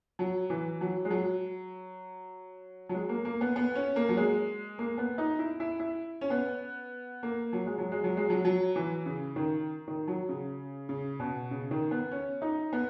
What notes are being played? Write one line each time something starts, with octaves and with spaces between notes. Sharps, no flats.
F#3
E3
F#3
G#3
F#3
F#3
G#3
A#3
A#3
B3
B3
C#4
A#3
F#3
G#3
A#3
B3
D#4
E4
E4
E4
C#4
B3
A#3
F#3
G#3
F#3
G#3
F#3
G#3
F#3
F#3
E3
C#3
D#3
D#3
F#3
C#3
C#3
B2
C#3
D#3
B3
C#4
D#4
B3